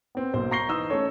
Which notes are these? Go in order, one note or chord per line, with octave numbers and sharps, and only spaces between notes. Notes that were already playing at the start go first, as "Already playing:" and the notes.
B3 C4
B1 A#3 C5
A#5 C#6 A#6 C7 G7
E3 D#4 D#6 E6
A3 C#4 A4 C#5